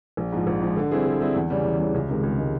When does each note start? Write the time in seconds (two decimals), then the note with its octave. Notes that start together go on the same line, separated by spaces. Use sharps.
0.17 A#1
0.33 G#2 F3
0.47 A#1
0.62 G#2 F3
0.77 D3
0.91 G3 C4 E4 G#4
1.06 D3
1.21 G3 C4 E4 G#4
1.35 E2
1.50 C#3 E3 G3
1.64 E2
1.79 C#3 E3 G3
1.94 C#2
2.08 C3 D#3 G#3
2.23 C#2
2.38 C3 D#3 G#3